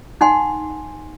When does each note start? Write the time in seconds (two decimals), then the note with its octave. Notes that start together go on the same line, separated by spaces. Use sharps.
0.21 D#4 F#5 G#5 C6